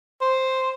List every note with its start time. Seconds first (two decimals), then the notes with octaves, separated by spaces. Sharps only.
0.21 C5